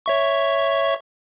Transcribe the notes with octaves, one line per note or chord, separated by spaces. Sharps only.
C#5 E5 C#6